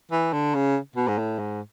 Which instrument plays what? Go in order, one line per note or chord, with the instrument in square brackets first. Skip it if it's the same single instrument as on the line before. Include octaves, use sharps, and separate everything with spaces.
[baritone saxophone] E3
D3
C#3
B2
G#2
A2
G#2